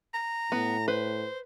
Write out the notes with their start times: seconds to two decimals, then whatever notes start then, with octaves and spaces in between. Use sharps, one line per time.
0.14 A#5
0.52 A2 B3
0.88 B4 C5